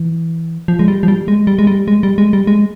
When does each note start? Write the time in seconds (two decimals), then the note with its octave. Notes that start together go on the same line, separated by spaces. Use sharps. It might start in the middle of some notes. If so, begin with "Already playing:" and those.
Already playing: E3
0.68 F3
0.79 G#3
0.88 G3
1.03 F3
1.08 G3
1.28 G#3
1.47 G3
1.59 G#3
1.67 G3
1.88 G#3
2.03 G3
2.18 G#3
2.33 G3
2.47 G#3